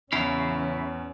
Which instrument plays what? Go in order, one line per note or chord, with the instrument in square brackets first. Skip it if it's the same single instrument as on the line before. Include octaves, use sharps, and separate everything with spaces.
[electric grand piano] E2 [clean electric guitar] C#3 E4 F5 [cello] E3 [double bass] C#4